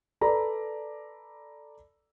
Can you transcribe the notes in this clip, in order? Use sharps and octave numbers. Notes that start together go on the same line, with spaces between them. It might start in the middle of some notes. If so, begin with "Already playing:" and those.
A4 B4 D5 A#5 B5